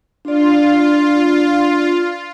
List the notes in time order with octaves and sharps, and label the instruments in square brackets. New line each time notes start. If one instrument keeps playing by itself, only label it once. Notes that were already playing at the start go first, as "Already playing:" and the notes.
[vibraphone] D4 D5 [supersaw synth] F4